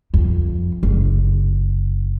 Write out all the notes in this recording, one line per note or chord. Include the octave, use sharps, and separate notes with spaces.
F2
F#1